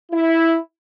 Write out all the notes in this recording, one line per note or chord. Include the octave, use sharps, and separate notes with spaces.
E4